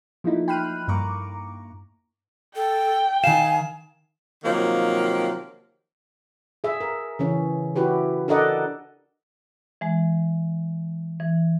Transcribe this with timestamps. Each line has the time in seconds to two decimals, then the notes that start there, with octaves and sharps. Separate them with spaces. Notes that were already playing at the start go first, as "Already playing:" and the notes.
0.24 F3 A3 A#3 D#4 E4
0.48 G5 B5 C6 F6 F#6 D#7
0.88 G2 A#3 A#5 C#6 D6
2.55 A4 G5
3.24 D#3 F5 G#5 E7
4.44 C3 D#3 F3 F#3 A#3
6.64 G#4 E5
6.81 A#4
7.19 C#3 E3 C#4
7.76 E4 F#4 G4 B4
8.28 D4 A4 A#4 D5 D#5 F#5
9.81 E3 G#3
11.20 E3